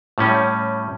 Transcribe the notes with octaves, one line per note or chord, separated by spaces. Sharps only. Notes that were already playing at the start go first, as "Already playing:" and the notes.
A2 G3 C#4